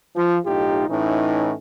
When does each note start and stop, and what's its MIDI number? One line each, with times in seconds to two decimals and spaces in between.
0.16 0.37 53
0.46 0.85 35
0.46 0.85 45
0.46 0.85 63
0.46 0.85 65
0.46 0.85 67
0.88 1.53 45
0.88 1.53 52
0.88 1.53 61
0.88 1.53 63